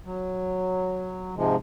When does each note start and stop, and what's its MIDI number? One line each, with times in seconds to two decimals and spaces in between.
0.05 1.35 54
1.36 1.56 44
1.36 1.56 48
1.36 1.56 53
1.36 1.56 56